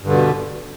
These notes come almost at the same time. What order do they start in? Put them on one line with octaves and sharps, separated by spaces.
G2 D3 B2